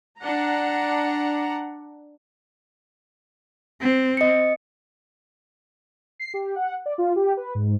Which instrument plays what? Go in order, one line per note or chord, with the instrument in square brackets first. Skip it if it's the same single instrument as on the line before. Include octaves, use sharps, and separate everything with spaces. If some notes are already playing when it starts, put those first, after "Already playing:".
[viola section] D4 F#5 A#5
[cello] C4
[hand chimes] D#5 C#7
[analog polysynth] C7
G4
F#5
D5
F4
G4
B4
G#2